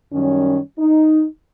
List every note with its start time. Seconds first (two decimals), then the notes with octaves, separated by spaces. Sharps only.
0.12 F#2 D#3 G3 C#4
0.79 D#4